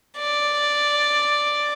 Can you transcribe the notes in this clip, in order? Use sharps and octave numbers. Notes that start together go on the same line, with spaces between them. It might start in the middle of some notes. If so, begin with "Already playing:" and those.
D5